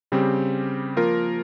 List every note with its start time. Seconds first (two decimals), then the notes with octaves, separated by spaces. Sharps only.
0.12 C#3 G3 C4 G4
0.97 F3 A#3 F4 A#4